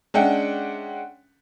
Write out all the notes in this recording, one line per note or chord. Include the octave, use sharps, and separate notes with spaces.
G#3 C#4 D4 E5 F#5 G5